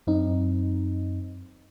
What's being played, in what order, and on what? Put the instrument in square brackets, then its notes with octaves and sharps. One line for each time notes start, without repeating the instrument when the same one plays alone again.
[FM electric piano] F#2 C4 D#4